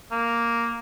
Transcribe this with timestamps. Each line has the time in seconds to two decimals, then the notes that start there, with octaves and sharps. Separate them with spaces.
0.11 A#3